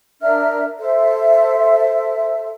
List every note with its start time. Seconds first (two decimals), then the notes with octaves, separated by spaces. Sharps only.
0.21 D4 A#4 E5 F6
0.79 A4 C5 E5